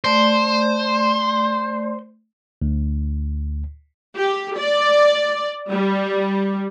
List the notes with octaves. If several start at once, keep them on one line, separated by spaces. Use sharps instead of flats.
A3 C5 D5 C6
D2
G4
D5
G3